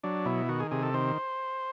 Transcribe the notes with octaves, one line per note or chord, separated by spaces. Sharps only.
F#3 D4
B2 E4
D#3 F#4
G#4
C3 G#4
A4
D#3 C5